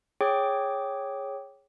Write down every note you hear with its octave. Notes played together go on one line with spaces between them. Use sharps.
G#4 C#5 G5 D6